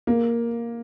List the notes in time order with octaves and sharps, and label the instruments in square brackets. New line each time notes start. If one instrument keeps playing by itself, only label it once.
[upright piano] A#3